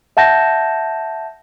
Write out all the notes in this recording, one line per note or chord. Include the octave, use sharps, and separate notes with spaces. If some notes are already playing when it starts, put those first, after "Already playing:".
E5 F#5 A5 G6 A#6